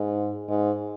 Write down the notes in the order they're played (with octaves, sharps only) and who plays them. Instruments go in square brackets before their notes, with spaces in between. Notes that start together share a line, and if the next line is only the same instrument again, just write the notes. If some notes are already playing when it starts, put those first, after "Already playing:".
Already playing: [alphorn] G#2
G#2